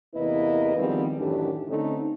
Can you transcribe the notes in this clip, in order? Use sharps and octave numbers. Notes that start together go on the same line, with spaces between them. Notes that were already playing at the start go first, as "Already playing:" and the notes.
E2 C3 A#3 E4 B4 D#5
D#3 F3 G3 G#3 B3 C4
F#2 A2 D#3 E3 D4 G4
D3 A3 C4 C#4 D#4